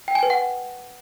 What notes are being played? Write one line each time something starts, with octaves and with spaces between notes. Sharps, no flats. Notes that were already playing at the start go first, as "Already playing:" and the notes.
G5
G#5
B4
F#5